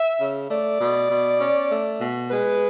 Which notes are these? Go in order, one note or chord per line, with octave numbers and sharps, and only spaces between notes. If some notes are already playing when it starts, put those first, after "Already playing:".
Already playing: E5
C#3
A3 D5
B2
B2
C#4
A3
B2
G#3 B4